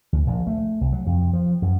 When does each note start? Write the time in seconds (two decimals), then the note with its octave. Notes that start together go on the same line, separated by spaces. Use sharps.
0.13 D2
0.27 A#1
0.47 A3
0.81 C2
0.93 F#3
1.06 F2
1.33 F3
1.62 F#2